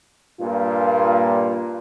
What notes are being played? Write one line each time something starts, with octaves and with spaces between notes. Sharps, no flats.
G2 A#2 F4